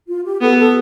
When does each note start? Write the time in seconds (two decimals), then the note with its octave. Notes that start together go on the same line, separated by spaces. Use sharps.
0.08 F4
0.25 G4
0.41 B3 A4
0.58 A4